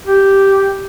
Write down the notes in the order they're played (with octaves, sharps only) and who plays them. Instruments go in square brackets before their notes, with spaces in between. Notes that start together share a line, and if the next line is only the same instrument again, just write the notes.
[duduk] G4